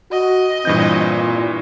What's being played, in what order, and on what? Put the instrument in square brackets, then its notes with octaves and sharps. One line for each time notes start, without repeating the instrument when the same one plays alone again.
[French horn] F#4 [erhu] D#5
[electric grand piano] G2 E3 G6 [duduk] A#2 [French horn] C4